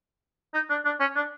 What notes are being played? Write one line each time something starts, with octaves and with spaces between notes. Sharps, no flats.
D#4
D4
D4
C#4
D4